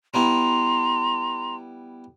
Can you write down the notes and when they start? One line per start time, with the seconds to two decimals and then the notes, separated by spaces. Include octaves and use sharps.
0.14 G3 B3 E4 A#5 C6